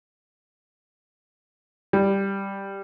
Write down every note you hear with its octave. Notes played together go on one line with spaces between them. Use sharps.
G3